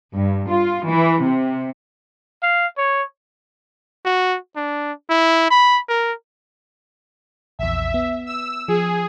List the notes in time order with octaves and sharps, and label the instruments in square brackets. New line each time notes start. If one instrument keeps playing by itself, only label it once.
[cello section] G2
F4
E3
C3
[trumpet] F5
C#5
[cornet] F#4
D4
E4
B5
A#4
[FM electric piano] A#1 E2 [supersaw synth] E5
[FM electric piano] B3
[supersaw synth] E6
[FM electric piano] F3 [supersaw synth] G#4